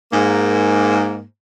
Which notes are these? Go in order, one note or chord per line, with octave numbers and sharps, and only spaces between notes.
G#2 A#3